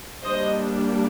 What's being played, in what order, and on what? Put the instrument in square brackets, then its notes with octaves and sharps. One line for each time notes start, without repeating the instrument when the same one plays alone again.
[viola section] G3 A#3 D4 C5 D#5